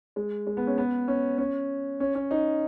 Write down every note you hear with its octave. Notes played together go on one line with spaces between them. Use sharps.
G#3
G#3
B3
C#4
B3
C#4
C#4
C#4
C#4
D#4